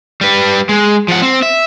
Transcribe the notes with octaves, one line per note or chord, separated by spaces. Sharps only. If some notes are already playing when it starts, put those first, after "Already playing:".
G3 B4
G#3
F3 F#5
C4
E5